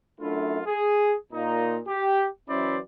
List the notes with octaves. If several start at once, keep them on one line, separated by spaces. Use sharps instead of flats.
F#2 A3 D4 E4 F4
G#4
A#2 D#4
G4
E3 F#3 C#4 E4 C5 D5